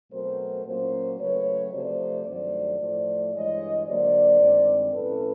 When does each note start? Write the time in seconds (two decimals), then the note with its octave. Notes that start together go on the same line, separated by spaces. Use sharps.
0.12 B2 F#3 A3 C4 A#4 C5
0.65 A#2 F#3 A#3 C#4 A#4 C5
1.19 C#3 F#3 A3 B4 C#5
1.72 C3 F3 A3 C4 C5 D5
2.26 G2 D#3 F#3 A3 C5 D5
2.79 A2 F3 A3 C5 D5
3.33 G2 E3 G#3 C#5 D#5
3.87 D3 F#3 A#3 C5 D5
4.40 G2 D#3 G#3 C4
4.94 A2 F3 A3 C#4 A4 B4